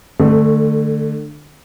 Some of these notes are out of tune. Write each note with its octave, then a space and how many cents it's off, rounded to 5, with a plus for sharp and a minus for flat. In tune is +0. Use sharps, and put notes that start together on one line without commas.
D3 +25 A3 +0